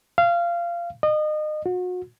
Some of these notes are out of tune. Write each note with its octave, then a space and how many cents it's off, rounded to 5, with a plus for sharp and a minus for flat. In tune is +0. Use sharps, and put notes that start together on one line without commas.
F5 -20
D#5 -30
F#4 -35